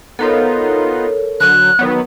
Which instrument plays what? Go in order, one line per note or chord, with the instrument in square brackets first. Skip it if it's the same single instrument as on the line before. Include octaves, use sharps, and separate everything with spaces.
[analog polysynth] B3 D#4 F4 [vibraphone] A4 A#4 C#5
[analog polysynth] D3 F#3 [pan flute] F#6
[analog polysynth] D#3 F#3 B3